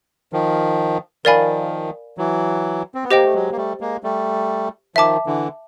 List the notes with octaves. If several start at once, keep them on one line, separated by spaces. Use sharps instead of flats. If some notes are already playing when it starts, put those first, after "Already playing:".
D#3 F3
D#3 F3 A#4 D5 F5 G#5 B5
E3 F#3
C4
B3
A#3 G4 C5 D#5 G5
A3
F#3 G#3
A#3
G3 A3
G#3 A#3
G3 A3
D#3 F3 E5 A5 D6
D3 E3